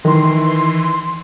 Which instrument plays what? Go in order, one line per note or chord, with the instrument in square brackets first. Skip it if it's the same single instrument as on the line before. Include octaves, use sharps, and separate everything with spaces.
[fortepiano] D#3 [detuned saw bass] E3 [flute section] C6